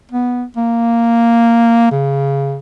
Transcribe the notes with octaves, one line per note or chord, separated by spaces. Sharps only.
B3
A#3
C#3